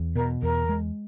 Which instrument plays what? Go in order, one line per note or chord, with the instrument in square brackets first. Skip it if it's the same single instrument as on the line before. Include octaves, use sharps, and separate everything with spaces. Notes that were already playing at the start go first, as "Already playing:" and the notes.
Already playing: [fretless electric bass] E2
[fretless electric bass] B2 [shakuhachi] A#4
[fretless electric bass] E2 [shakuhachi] A#4
[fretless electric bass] G#3